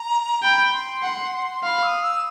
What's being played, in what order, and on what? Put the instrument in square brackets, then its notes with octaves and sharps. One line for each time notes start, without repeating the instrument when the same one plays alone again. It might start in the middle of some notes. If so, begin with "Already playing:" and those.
Already playing: [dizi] A#5
[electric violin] G5 [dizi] B5
[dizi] C6
[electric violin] F#5
[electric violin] F5 [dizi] B5 C6
[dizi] E6
D#6
E6